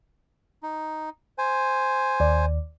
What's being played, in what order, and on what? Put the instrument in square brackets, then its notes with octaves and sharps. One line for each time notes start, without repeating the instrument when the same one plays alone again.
[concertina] D#4
C5 G#5
[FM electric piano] D#2 D5